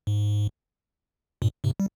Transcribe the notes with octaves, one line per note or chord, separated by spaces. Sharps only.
G#2
G2 A#2
G#2 C3
G3